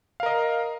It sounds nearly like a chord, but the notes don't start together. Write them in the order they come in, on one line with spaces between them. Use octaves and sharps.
F5 A#4 D#5